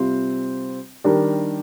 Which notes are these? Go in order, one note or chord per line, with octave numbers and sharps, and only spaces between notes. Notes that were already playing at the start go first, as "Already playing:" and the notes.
Already playing: C3 G3 C4 F4 C5
D#3 G3 D4 G4 A#4